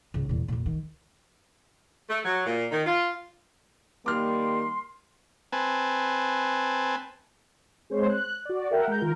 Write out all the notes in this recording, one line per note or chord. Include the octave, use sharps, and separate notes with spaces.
C#2 G#2
E2 A#2
F2 A#2
D#3
A3
F#3
A#2
D#3
F4
D#3 G3 A#3 C6 D6 F6
C4 B4 G#5 A5
G#3 C4 C5 C#5
F#6
F#4 D5
A4 A#4 E5 F#5 G5
G#3 A#5 G6
D#3 F4 A#4